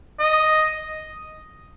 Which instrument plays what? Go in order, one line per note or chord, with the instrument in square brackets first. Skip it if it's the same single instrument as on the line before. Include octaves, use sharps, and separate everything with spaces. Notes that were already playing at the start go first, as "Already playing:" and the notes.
[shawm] D#5